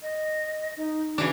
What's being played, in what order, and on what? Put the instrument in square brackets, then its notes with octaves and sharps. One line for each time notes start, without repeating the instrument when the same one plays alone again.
[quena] D#5
D#4
[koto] C#3 E3 D4 [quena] F#4